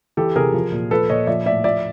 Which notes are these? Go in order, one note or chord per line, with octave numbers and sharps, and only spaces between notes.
E3 G4 A4
C3 G#4 A#4
F3
A#2
F3 A4 B4
A#2 C#5 D#5
F3 D5 E5
A2 D5 E5
F3 D5 E5